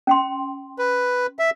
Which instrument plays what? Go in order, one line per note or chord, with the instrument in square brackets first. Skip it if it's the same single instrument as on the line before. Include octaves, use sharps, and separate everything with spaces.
[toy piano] C#4 G5 C6
[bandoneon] B4
E5